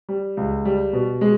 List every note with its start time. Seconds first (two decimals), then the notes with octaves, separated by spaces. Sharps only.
0.09 G3
0.37 C#2
0.65 G3
0.93 B2
1.21 G#3